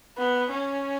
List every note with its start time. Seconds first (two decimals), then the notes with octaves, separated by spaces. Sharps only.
0.17 B3
0.51 C#4